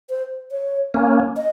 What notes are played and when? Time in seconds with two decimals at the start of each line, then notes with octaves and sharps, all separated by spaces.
0.10 C5
0.51 C#5
0.94 A#3 C#4
1.37 D#5